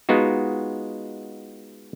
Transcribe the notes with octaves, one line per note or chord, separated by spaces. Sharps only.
G#3 B3 D#4 F4 F#4